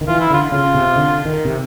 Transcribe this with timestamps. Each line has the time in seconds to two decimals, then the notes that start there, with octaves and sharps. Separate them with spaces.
0.01 D#3
0.08 E3 F4
0.20 E4
0.30 D3 F4
0.52 C#3 F4
0.75 C3
0.96 D3
1.25 D#3
1.45 C3